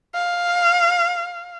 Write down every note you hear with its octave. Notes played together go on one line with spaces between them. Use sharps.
F5